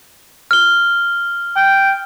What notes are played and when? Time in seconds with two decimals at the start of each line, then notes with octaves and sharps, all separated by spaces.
0.51 F6 G7
1.56 G5